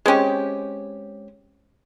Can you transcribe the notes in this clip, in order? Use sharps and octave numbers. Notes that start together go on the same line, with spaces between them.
G#3 C4 C#4 G4